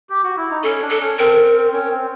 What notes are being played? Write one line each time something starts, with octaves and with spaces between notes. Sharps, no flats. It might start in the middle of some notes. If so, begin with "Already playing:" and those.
G4
F#4
E4
D#4
C#4 A4
D4
A4
C#4
C4 A#4
C#4
C4